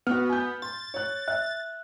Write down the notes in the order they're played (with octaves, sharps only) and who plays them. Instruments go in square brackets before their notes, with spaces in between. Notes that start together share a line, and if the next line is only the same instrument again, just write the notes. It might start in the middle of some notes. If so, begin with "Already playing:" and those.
[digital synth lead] B3 [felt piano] F#4 F6
[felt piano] G#5 G6
[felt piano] C6 [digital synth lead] A6
[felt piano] C#5 F#6
[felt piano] E5 [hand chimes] F#6